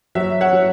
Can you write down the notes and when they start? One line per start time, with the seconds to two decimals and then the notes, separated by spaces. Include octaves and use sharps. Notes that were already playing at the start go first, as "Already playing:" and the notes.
0.15 F#3 E5
0.41 C#5 F#5
0.53 F#3